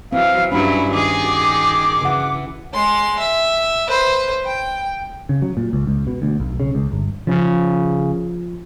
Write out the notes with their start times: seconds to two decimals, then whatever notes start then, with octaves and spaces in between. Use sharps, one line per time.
0.12 E3 F#3 C4 F5
0.52 G2 F#3 C#4 D4 E4 B5
0.92 D#3 G#4 D6
1.24 F#4
2.02 C#3 E3 F#5
2.73 G#3 C6
3.19 E5
3.87 B4 C5
4.46 G5
5.29 C#3
5.42 F#3
5.57 A#2
5.73 C#2
5.87 C#2
6.07 B2
6.22 D2
6.40 B1
6.60 C#3
6.75 C#2
6.92 G1
7.27 C#3 F3